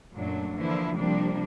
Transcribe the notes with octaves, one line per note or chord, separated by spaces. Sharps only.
F#2 A#2 F#3 A3 D4
D3 E3 F3 A#3 E4
C3 F3 G3 A#3 D4